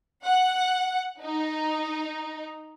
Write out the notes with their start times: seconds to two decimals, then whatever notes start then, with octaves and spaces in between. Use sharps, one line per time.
0.24 F#5
1.22 D#4